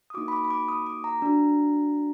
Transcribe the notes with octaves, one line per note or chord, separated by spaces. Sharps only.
D#6
A#3 D#4 F#4 D6
B5
D6
B5
D6
D#6
D6
A#5
D4 F#4